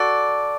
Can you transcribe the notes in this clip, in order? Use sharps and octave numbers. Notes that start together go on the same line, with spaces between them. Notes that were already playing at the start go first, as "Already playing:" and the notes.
Already playing: F#4 A4 D5